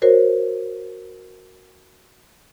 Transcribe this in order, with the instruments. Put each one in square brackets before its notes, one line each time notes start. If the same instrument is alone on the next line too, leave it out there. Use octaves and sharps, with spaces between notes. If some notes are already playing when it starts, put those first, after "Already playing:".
[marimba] F#4 A#4 C5 C#5